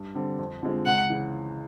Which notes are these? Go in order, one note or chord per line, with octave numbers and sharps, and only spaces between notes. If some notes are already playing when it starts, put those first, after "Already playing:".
Already playing: G2
D3 G3 C4
F2
D3 F3 G#3 C4
C#2 F#5
C#3 E3